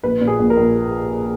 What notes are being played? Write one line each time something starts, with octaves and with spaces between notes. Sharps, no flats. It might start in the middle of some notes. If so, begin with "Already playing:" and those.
A#1 B4
A#2
G#4
A#1
A#4
A#1